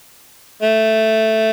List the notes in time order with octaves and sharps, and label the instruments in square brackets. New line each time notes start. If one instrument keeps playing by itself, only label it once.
[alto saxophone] A3